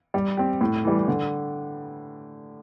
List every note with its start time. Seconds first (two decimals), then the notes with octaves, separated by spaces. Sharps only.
0.14 G3
0.37 C4 G4
0.61 A2
0.84 E3 G3
1.08 D3